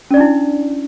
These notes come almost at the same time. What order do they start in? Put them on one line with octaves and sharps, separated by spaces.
C#4 D5 D4 E4